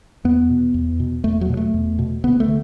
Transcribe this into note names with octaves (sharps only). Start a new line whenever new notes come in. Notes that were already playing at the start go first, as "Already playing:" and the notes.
E2 B3
B2
E2
B2
E2 A3
F#3
B2
A3
E2
B2
D2 B3
A3
D3